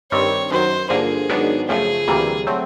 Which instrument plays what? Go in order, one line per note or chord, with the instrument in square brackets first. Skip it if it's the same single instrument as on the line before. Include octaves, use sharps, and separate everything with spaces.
[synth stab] G2 D#3 G3 C4 [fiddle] C#5
[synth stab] F#2 D#3 F#3 [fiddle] C5
[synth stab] G2 D3 F3 A#3 [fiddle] G#4
[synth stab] G#2 D#3 F#3 B3 D4
[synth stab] F#2 C#3 F3 A3 [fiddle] G#4
[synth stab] D2 C3 E3 G3 A#3
F#3 A3 C4